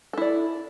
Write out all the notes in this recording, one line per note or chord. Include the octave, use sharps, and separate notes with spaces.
E4 A4 D5